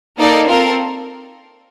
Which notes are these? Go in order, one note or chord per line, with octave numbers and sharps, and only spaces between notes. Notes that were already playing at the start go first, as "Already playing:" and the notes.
A#3 D#4 A4 D5
C4 F4 A4 A#4